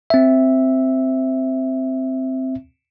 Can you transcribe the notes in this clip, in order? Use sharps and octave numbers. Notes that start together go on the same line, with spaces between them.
C4 E5